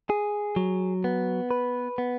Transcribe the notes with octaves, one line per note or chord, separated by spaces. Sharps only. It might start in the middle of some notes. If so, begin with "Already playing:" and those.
G#4
F#3
B3
B4
B3